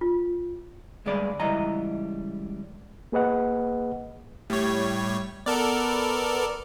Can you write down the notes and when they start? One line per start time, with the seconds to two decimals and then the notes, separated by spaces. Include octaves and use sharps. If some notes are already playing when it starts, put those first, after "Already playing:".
0.01 F4
1.06 D2 G2 G#3 G#4 D5 B5
1.40 C#2 E3 G3 D#5 A#5
3.12 A#3 G#4 B4 D#5 F#5
4.50 A2 G3 C#5
5.46 B3 A4 A#4 D5